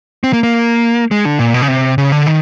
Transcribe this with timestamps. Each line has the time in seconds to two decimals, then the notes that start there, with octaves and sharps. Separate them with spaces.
0.24 C4
0.33 A#3
0.43 A#3
1.11 G#3
1.25 D3
1.39 A#2
1.54 B2
1.62 C#3
1.68 C3
1.98 C#3
2.12 D3
2.27 D#3